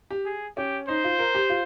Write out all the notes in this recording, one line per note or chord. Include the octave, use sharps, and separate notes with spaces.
G4
G#4
C#4 G4
D#4 C5
F4
A#4
G4
F4